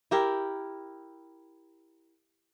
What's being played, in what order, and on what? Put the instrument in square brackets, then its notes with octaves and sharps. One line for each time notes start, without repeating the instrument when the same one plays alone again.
[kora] E4 G4 A#4